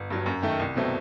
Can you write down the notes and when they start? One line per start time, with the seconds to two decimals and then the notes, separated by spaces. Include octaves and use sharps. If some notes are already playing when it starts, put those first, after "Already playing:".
Already playing: G1
0.10 G2 F#3
0.26 F#2
0.42 D#3 A3
0.60 C2
0.76 B2 F#3 A3 C4